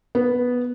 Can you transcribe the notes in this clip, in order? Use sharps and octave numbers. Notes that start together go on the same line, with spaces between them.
B3